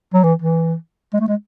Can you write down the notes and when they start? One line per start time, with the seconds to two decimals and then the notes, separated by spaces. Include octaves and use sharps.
0.14 F#3
0.24 E3
0.42 E3
1.13 G#3
1.20 A3
1.28 G#3